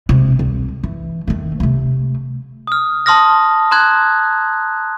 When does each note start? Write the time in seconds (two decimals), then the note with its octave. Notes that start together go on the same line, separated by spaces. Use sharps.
0.09 C3 G#3
0.39 C2
0.83 E3
1.27 D#3 A3
1.60 C3 A3
2.67 D#6 F6
3.06 A5 C6 D#6 F6 A#6
3.71 A#5 C6 F#6 G#6